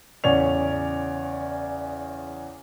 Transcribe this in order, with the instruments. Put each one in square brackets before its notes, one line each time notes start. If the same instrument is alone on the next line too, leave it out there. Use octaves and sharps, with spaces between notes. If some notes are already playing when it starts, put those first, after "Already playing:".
[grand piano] E2 C#3 C#5 D5 F7